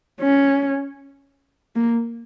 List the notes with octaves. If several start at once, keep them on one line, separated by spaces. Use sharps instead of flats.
C#4
A#3